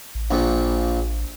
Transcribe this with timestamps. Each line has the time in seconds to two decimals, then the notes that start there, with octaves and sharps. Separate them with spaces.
0.15 A1
0.31 A#1 A#2